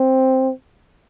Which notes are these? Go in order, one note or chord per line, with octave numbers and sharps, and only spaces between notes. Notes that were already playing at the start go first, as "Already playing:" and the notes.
Already playing: C4